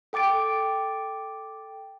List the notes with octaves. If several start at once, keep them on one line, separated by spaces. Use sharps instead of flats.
A4 G5 D6 A6 D7